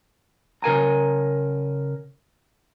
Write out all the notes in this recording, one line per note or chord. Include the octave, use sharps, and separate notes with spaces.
C#3 A#4 G#5 A#5